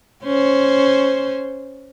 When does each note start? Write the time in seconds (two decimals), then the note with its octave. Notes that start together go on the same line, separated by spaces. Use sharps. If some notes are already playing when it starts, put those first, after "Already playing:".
0.23 C#4 C5